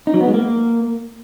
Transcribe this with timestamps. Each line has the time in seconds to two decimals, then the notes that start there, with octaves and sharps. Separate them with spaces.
0.07 D#4
0.14 F#3
0.21 B3
0.27 G#3
0.34 A#3